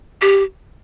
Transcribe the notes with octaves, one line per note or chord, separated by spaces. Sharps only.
G4